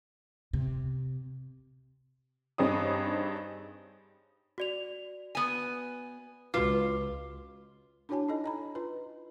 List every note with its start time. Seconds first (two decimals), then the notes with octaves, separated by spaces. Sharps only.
0.53 C3
2.58 G2 C4 D#4 G#4 C#5 D#6
4.58 F#4 D5 F7
5.35 B3 G#5
6.54 C#2 F4 F#4 B4 D6
8.09 D4 E4 F#4 C#5 G#5 A5
8.28 D#4 E4 A4 D#5
8.44 D#5 A#5 B5
8.75 F4 B4